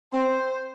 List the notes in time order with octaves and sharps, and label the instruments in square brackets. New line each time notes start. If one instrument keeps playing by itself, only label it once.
[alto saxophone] C4 [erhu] C5